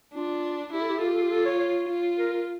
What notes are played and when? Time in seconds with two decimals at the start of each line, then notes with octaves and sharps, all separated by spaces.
0.15 D4 F4
0.73 E4 G4
0.81 A4
0.89 G4
0.98 A4
1.02 F4 G4
1.14 A4
1.22 G4
1.31 A4
1.45 C#5
1.60 C#5
1.89 F4
2.18 A#4
2.33 A#4